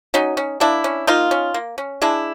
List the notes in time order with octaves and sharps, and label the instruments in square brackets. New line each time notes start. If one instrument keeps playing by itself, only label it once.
[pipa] F#3 C#4 D#4
C#4
A#3 D4 E4
C#4
A#3 D#4 F4
C#4
A#3
C#4
G#3 D4 E4